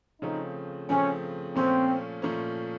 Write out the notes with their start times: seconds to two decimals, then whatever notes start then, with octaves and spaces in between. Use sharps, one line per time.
0.22 C#3 F3 A3 C4 D#4
0.89 C#3 F3 A3 C4 C#4
1.55 A#2 F3 A3 C4 C#4
2.22 A#2 F3 A3 C#4